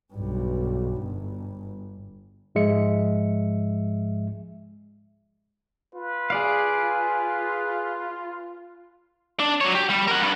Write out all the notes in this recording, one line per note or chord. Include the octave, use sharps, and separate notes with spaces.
B1 G2
G1
G#2 F3 G#3 E5 C#7
F4 B4
G#4 D5 F5
D4
F#3 C#5
G4
G3
A#4 F#5
G2 B4